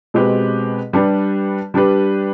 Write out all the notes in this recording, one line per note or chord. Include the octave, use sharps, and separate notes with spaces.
B2 G#3 C4 G4 B4
G3 D4 G4 B4
G3 D4 G4 B4